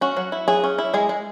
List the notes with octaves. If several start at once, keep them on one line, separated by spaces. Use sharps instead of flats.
C#4 F#4
F#3
E4
F#3 G#4
C#4
E4
G#3 G#4
G#3